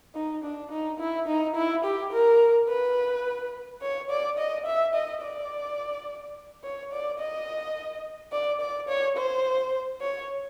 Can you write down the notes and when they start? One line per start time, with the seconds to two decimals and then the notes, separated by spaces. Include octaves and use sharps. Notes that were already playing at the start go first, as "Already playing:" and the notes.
0.15 D#4
0.44 D4
0.71 D#4
0.99 E4
1.27 D#4
1.55 E4
1.84 G4
2.12 A#4
2.69 B4
3.82 C#5
4.10 D5
4.38 D#5
4.66 E5
4.94 D#5
5.22 D5
6.63 C#5
6.92 D5
7.19 D#5
8.32 D5
8.61 D5
8.88 C#5
9.16 C5
10.01 C#5